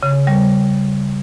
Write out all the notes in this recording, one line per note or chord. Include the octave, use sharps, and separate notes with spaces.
C#3
G3